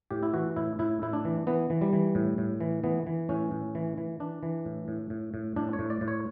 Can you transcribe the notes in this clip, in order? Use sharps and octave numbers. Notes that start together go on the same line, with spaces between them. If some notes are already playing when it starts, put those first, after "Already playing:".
A2 G4
E4
E3 F#4
A2 E4
A2 E4
A2 E4
D4
E3
E3 B3
E3
G3
E3
A2
A2
E3
E3 B3
E3
A2 C#4
A2
E3
E3
E3 D4
E3
A2
A2
A2
A2
A2 D4
C#5
A2
D5
A2
C#5